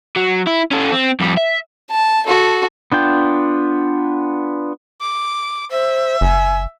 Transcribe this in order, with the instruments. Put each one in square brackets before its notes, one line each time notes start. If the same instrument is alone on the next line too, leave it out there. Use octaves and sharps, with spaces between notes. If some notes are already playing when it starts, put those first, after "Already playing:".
[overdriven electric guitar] F#3
E4
C#4 A4
C4
F2 G3
E5
[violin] A5
F#4 A4
[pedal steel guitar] B3 D4 F4 G5
[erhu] D6
[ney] C5 [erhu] E5
[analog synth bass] F#1 [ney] G#5